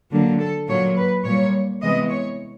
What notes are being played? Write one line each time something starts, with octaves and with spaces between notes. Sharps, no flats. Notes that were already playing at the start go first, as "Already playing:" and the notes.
D3 F#3 A#3
A4
A#2 F#3 A#3 C#5
B4
A#2 G3 A#3 C#5
C3 E3 G#3 B3 D#5
C#5